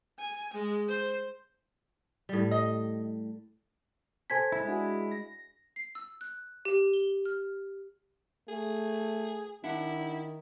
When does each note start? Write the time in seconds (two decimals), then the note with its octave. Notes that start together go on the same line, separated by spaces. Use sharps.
0.18 G#5
0.53 G#3
0.88 C5
2.29 A2 G3
2.51 D#5
4.30 A4 C5 G#5 A5 G#6 B6
4.52 G#3 E4
4.68 D4 F#4 G#4
5.11 A#6
5.76 C7
5.95 E6
6.21 F#6
6.65 G4
6.93 G7
7.26 F6
8.48 A3 G#4
9.64 D#3 D4 E4 F#5